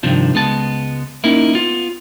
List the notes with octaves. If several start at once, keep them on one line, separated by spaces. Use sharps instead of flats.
G2 C3 D#3 F3 D4
C#2 G#3 B3 A5
A#3 C#4 D#4 E4 A#4
B3 F4